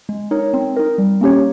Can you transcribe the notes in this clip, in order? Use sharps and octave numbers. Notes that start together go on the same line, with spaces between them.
G#3
D#4 A#4 C#5
C4
D#4 A#4
G3
A#3 C#4 G4 C#5